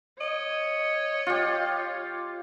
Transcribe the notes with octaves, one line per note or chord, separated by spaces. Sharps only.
C#5 D#5
F4 G4